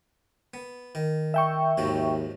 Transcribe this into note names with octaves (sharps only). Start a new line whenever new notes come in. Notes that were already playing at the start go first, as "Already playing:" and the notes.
B3
D#3
E5 G5 C#6
D#2 G#2 F3 F#3